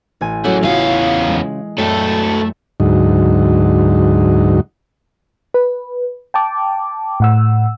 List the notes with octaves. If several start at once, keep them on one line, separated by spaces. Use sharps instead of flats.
A1 G#5
F#3 A3 C#4 E4 G#4 F#5
E2 C#3 B3 C#4 F4 F#4 F5
G#3
F#2 F#3 A3 A4 D5 G5
D2 G#2 F#3 D#4
B4
G5 A5 D6
A2 F#5 E6